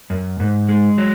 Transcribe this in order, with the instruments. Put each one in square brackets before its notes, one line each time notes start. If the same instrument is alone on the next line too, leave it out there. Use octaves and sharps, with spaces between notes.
[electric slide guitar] F#2
G#2
G#3
F#3